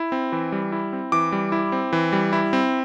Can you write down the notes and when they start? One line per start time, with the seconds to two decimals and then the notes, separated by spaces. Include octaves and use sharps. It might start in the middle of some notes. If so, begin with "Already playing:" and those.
Already playing: E4
0.12 C4
0.32 E3
0.52 G3
0.72 E4
0.93 C4
1.12 E3 D6
1.32 G3
1.52 E4
1.72 C4
1.93 E3
2.13 G3
2.33 E4
2.53 C4